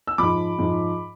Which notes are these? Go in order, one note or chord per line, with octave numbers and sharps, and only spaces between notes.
E6
G#2 F3 B5 D6
G#2 F3